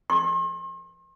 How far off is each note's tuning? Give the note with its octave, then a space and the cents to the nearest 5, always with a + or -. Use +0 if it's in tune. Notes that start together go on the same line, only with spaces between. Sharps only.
C6 +40